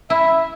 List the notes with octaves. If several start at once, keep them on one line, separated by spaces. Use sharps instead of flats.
E4 E5